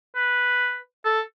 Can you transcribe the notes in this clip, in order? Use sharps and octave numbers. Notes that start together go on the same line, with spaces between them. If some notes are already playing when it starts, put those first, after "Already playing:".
B4
A4